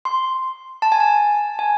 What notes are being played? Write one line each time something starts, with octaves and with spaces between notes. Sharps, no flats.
C6
A5
G#5
A5
G#5